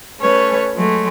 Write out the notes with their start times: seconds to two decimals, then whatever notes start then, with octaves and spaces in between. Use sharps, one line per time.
0.20 A3 C#4 B4 C#5
0.76 F#3 G#3 A3